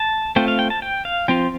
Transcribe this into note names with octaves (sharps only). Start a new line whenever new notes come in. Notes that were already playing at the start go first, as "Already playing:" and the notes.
Already playing: A5
A3 C4 F4 G5
F5
G5
A5
G5
F5
F3 C4 F4 G5